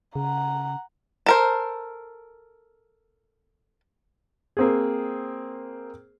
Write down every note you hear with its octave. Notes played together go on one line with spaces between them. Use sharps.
C#3 F#5 A#5
A4 A#4 C5
A#3 C4 G#4